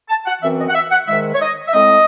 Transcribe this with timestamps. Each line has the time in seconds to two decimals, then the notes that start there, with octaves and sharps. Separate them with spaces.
0.09 A5
0.27 F#5
0.42 F#2 E3 C4 E5
0.59 D#5
0.69 F#5
0.75 E5
0.92 F#5
1.08 G#2 D#3 G#3 E5
1.35 C#5
1.41 D#5
1.68 E5
1.73 A2 G#3 C4 D#5